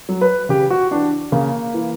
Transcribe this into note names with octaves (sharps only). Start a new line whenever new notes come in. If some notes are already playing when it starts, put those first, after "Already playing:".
F#3
B4
C#3 G4
F#4
E3 D4
C#3 A#3
E3